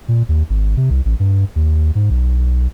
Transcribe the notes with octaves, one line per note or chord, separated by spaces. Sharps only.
A#2
D#2
G#1
C3
C2
A1
G2
D#2
G#2
B1